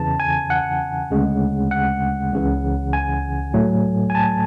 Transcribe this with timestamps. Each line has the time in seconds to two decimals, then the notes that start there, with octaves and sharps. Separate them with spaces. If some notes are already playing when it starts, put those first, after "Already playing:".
Already playing: E2 C#3 E3 A5
0.20 G#5
0.50 F#5
1.11 D2 C#3 G#3
1.71 F#5
2.33 C#2 C#3 E3
2.93 G#5
3.54 A2 F#3 A3
4.10 G#5
4.15 A5